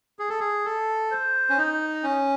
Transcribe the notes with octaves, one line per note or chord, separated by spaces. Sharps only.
G#4
A4
G#4
A4
C5
C#4
D#4
C#4